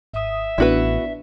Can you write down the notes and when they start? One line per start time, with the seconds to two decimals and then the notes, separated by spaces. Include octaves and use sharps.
0.14 G#1 E5 D#6
0.58 A1 B3 D4 E4 F#4 B4